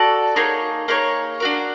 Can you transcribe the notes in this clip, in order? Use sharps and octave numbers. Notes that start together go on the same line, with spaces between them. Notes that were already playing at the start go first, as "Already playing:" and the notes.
Already playing: F#4 A4 D5
A#3 D#4 G#4 C#5
A#3 D#4 G#4 C#5
D4 F#4 A#4